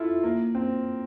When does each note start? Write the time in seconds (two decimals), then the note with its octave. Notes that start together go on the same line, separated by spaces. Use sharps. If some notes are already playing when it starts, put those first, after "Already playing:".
Already playing: E4 F4 A4
0.24 A#3
0.55 C4